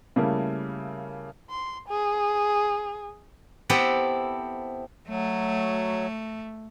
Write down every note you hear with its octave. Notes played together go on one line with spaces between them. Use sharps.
C#3 G3 A3 A#3 E4
C6
G#4
B3 C4 E4 G4 A4
F#3 A3